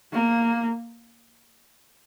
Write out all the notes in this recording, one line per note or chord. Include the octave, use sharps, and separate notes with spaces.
A#3